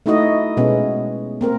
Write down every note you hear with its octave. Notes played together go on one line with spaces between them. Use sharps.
A3 D#4 E4 F#4 D#5
B2 G#3 B3 C#4
A#3 C4 A#4